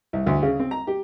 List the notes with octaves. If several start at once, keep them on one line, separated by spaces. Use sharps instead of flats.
C2
D2
C#3
C4
A#5
G4